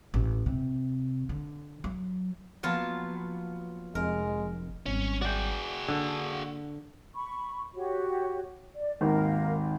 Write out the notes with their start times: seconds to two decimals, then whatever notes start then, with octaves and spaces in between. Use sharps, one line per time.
0.14 A1
0.46 C3
1.29 D3
1.84 F#3
2.63 F3 F#3 A#3 B3 F4 A5
3.95 F1 G#3 A#4
4.86 G#1 G3 C#4
5.22 F#4 G#4 D5 G5
5.88 D3 A#3
7.14 B5 C#6
7.75 F#4 G4 C#5
8.75 D5
9.01 G#1 D#2 A#4 F5